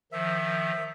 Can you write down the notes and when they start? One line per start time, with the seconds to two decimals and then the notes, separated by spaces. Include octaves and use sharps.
0.12 D#3 F3 E5